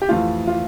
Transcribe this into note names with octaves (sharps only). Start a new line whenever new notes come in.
G4
F2 E3 A3 F4
F4